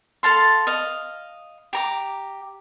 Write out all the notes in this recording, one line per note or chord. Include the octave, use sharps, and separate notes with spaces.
A4 F5 A5 C6
D#5 F5
G4 A#5 D6